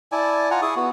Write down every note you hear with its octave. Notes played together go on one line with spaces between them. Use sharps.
E4 D5 G#5 A5
F4 F#5 G#5 A#5
E4 G#4 C#6 D#6
B3 F#4